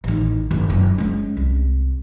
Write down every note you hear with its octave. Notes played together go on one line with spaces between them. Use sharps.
A1 D#3
G1
F#1 F#2
G#3 C#4
C2